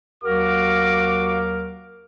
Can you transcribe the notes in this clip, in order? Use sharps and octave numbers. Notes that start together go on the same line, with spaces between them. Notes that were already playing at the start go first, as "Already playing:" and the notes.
D#2 F#3 F#4 A#4 F5 D6